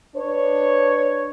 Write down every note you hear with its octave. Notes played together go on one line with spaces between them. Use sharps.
D4 B4 C#5